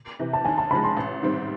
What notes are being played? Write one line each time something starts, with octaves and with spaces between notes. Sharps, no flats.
C3 E3
A5
D#2 G#5
A5
C#3 F3 G#3 B5
C6
A1
G#2 D#3 G3 C4